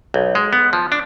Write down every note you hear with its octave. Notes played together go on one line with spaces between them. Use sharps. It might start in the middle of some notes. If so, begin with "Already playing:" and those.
B1
G#3
B3
F3
D4